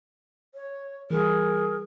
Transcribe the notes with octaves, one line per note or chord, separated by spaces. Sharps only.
C#5
E3 G3 G#4 A#4